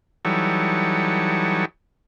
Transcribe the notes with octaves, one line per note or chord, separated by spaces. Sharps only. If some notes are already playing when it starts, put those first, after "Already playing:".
E3 F#3 G3 D#4 A4 C#5